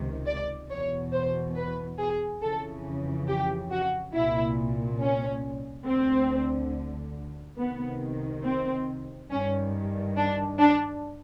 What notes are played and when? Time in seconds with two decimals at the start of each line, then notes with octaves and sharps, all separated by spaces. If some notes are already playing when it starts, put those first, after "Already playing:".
Already playing: C#2 C3 D#3
0.26 D5
0.69 E2 B2 C#5
1.12 C5
1.55 B4
1.98 G#4
2.41 F2 C#3 E3 A4
3.28 G4
3.71 F#4
4.14 C2 A#2 E4
5.00 C#4
5.86 D2 D3 C4
7.58 C2 C3 D#3 B3
8.44 C4
9.30 G2 D#3 C#4
10.17 D4
10.59 D4